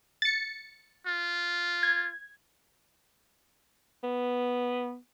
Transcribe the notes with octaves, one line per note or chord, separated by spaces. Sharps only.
A6 C#7
F4
G#6
B3